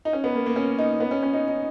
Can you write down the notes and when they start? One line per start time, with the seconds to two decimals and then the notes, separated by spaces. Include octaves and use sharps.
0.05 D#4
0.13 C#4
0.24 B3
0.35 A#3
0.46 A#3
0.56 C#4
0.78 D#4
1.00 B3
1.11 C#4
1.23 C#4
1.33 D#4
1.48 D#4